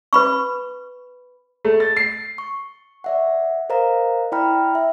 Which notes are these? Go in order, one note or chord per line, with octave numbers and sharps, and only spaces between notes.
B4 B5 C#6
A3
A6
C7
C#6
D5 E5 F#5
A#4 C5 D#5 F5 A#5
E4 D5 G5 A#5 B5 F6
E5